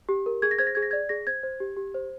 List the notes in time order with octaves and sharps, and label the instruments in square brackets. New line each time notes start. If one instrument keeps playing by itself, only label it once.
[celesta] G4
A#4
G#4 G#6
A#6
C5 G#6
A#6
G#4 G#6
A#6
D5 G#6
G#4 A#6
C5 G#6
C5
G4
G4
C5